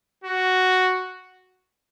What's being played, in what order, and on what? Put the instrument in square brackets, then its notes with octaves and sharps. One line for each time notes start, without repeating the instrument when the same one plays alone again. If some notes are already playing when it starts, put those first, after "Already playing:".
[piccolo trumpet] F#4